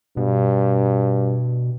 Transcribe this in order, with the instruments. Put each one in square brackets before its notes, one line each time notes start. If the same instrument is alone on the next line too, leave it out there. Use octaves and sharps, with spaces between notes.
[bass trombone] G2 [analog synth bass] B2